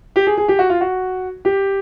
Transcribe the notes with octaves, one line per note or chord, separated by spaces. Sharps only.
G4
G#4
G#4
G4
F#4
F4
F#4
G4